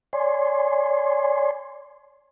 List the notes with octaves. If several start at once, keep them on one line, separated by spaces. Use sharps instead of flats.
C#5 D5 G#5 C6